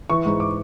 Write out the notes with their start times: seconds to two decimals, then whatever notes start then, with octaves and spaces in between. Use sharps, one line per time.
0.10 E3 C#6
0.25 G#2
0.40 D6